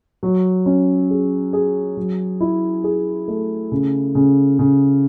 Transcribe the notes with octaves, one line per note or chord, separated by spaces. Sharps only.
F#3
C#4
G#4
G#4
F#3
E4
G#4
A3
C#3
C#3
C#3